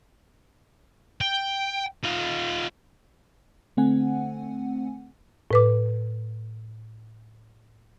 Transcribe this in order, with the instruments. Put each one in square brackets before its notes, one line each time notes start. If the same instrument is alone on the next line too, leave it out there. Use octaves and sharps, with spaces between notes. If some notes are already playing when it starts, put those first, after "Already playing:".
[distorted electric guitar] G5
D#4 F4
[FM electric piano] D3 A3 C4 F#5 G#5
[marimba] A2 B4 D6